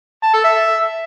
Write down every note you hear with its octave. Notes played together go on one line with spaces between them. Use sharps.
A5
A4
E5